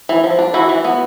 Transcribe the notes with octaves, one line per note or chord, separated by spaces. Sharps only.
E3
F3
D4
E3 E4 F#4
E3
B3